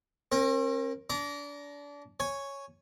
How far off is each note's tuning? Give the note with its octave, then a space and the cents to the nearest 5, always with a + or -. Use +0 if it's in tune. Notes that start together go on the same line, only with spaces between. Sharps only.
C4 +45 A#4 +0
D4 -30 A#5 +10
C#5 +0 G#5 +0